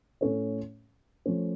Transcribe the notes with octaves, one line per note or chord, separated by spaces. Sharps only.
A2 A3 C#4 A4 C#5
F3 A3 C#4